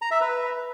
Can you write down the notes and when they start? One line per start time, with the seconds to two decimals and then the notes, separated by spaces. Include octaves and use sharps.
0.02 A#5
0.11 E5
0.21 B4